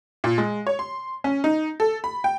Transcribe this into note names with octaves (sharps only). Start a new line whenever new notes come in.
A#2
G#3
C#5
C6
C#4
D#4
A4
B5
G5